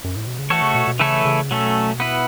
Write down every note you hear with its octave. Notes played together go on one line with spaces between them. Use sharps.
F#2
A2
B2
C#3
E3 A3 F#4 A4 C#5
C#3
B2
B2
C#3 E3 A3 E4 A4 C#5
C#3
B2 F#3 A3 C#4 A4
B3 E4 B4